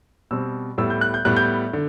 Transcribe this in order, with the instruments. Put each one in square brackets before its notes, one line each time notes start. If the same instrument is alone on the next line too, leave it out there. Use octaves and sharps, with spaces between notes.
[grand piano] B2 G3 C4 E6
A2 G3 B3 E6
G6
F#6
G6
A2 G3 B3 F#6
G6
D3